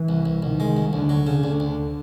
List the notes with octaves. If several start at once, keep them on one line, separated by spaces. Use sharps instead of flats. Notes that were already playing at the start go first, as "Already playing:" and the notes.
Already playing: E3
C2
C2
C2 D#3
G#3
C2
D2 D3
F#3
C#3
D2 D3
D2